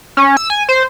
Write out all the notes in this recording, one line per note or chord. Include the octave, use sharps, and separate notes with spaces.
C#4
E6
G#5
C5